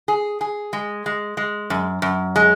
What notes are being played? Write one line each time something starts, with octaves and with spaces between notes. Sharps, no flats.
G#4
G#4
G#3
G#3
G#3
F#2
F#2
G#3